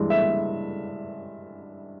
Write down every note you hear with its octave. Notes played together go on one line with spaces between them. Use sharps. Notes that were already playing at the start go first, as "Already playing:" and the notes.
Already playing: G2 E3 G#3
E5